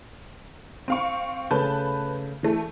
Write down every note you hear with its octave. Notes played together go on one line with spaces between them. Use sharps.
C4 F5 C#6
C#3 A3 B4 A5 G6
E3 A3